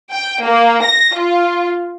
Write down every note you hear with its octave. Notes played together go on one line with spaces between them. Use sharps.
G5
A#3
A#6
F4